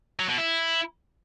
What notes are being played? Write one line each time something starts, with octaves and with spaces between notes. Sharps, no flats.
F#3
B2
E4